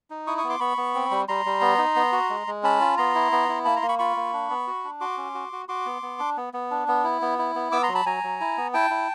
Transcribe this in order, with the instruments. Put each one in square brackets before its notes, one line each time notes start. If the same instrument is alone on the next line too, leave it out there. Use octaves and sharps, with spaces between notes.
[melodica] D#4
E4 C#6 D#6
C#6 D#6
B3
C6 D6
B3 B5 C#6
B3
C4
G3
G3 A#5 C6
G3
B3
D#4
B3
F#4
G#3
G#3
C#4 A5 B5
F4
B3 A#5 C6
E4
B3
E4
A#3 A5 B5
A#5 C6
A#3
B5 C#6
F4 B5 C#6
A#3
D4
B3
F#4
D4
F#4 C6 D6
C#4
F#4
F#4
F#4 C6 D6
B3
B3
D4
B3
B3
D4
B3
E4
B3
E4
B3
B3 D6 E6
A#5 C6
F#3
A5 B5
F#3 G#5 A#5
F#3
E4
B3
E4 G5 A5
E4